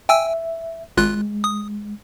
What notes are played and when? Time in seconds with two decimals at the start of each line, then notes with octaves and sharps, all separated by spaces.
0.09 E5 G5 G#5 E6
0.97 G#1 G#3 F4 F#6
1.44 D#6